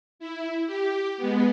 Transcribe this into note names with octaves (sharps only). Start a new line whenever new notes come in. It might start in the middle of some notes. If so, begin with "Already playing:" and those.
E4
G4
G#3 B3